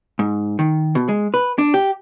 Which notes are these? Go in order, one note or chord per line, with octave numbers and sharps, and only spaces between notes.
G#2
D#3
B2
G#3
B4
D4
G4